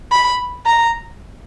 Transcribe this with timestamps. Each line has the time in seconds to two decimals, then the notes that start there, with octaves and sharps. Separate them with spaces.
0.12 B5
0.66 A#5